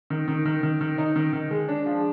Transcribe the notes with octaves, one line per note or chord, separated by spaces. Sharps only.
D#3
D#3
D#3
D#3
D#3
D#4
D#3
D#3
G#3
D4
F3